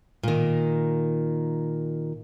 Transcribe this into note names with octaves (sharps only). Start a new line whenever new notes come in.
A#2 D#3